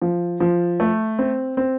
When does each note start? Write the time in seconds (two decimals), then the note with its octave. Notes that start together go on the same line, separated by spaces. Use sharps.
0.02 F3
0.40 F3
0.80 A3
1.19 C4
1.57 C4